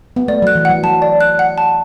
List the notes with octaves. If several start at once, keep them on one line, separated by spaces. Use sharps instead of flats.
B3
A3 D5
F#3 F#6
E3
F#3 F#5
F#3 A5
D5
F#6
F#5
A5